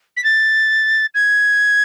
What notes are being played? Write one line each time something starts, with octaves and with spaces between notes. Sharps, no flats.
B6
A6
G#6